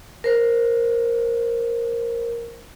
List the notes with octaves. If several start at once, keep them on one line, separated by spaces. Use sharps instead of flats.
A#4 C5